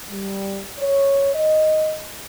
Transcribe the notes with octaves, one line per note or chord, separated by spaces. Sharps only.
G3
C#5
D#5